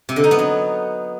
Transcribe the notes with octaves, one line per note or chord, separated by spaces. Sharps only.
C3
D3
D#4
B3
F#3